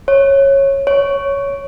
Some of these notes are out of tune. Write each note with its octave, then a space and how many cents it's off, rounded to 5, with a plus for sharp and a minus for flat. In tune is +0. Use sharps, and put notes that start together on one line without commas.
C#5 -15
C#5 +10